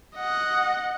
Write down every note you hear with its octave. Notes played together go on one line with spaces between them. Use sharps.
D#5 F#5